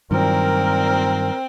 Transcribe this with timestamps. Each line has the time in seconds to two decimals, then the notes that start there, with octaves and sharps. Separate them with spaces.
0.11 G2 A#2 D#3 F#3 C4 A#4